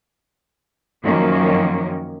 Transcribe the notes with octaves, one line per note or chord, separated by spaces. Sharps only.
F#2 D#3 F3 F#3 A#3 C#4